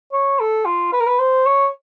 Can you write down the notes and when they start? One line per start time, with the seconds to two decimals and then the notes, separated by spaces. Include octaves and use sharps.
0.12 C#5
0.40 A4
0.65 F4
0.93 B4
1.00 A#4
1.07 B4
1.19 C5
1.46 C#5